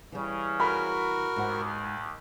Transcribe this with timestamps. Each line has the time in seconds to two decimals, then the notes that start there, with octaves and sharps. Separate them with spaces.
0.12 C#3 E3 G3
0.60 F#4 A#4 B5
1.36 D#2 G#2 F#5